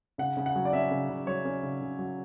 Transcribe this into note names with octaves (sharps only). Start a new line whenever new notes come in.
C#3 F#5
C#3
F#5
F#3
D5
C#4 E5
C#3
C#3
F#3 C#5
C#4
C#3
C#3
F#3